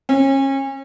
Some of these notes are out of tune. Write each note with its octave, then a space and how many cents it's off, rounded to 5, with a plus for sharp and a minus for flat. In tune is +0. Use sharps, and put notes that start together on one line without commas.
C#4 -30